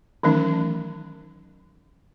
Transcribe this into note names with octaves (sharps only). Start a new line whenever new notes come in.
D#3 E3 F#3 A3 C#4 D#4